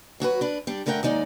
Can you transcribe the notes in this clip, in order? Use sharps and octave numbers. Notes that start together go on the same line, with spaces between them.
F#3 F#4 G#4 B4
D4 B4
G3 D4
G2 D3 A3 A#4 F#5 G5
D#2 G#3 D#4 D5